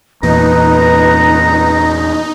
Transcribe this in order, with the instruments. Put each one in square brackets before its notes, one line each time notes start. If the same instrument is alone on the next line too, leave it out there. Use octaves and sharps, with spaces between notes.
[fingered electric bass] E2 A#2 [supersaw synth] D#4 [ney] B4 [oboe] A#5